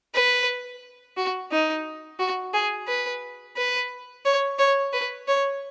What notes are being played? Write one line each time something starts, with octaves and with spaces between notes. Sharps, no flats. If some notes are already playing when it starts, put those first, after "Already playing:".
B4
F#4
D#4
F#4
G#4
B4
B4
C#5
C#5
B4
C#5